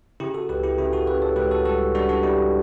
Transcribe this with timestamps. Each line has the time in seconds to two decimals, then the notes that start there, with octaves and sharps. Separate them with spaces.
0.20 C#3 E4 G4
0.34 F#4 A4
0.49 C#2 G4 B4
0.64 E4 G4
0.78 C#3 E4 G4
0.92 F#4 A4
1.07 C#3 G4 B4
1.22 A4 C#5
1.36 C#2 G4 B4
1.51 F#4 A4
1.65 G3 F#4 A4
1.95 G3 D4 F#4
2.09 D4 F#4
2.23 G3 E4 G4